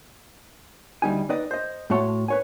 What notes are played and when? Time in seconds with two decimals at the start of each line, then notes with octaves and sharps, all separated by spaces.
1.02 D2 G3 D#4 G#5
1.29 D#4 B4 D5 D#5
1.51 C5 D#5
1.90 A2 A3 F#4 C#5 A5 C6
2.28 B4 C#5 G#5